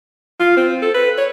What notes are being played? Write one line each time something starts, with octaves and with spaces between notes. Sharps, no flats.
F4
C4
A4
B4
C#5